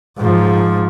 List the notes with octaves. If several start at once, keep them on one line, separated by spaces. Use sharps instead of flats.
G#2 F3